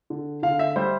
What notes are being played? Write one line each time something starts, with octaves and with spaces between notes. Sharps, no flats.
D3
D3 F5
E5
G3 C5